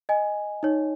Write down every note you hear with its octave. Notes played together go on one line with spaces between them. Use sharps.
D#5 G#5
D#4 C#5